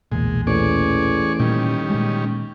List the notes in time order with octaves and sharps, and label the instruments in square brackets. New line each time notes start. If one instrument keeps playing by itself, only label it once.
[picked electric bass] B1 E2 A#2 [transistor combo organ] G#3
[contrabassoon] A1 [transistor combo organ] G#4 D5 C#6
[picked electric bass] A#2 [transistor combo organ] D#3 G3 C#4
[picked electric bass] A#2 G#3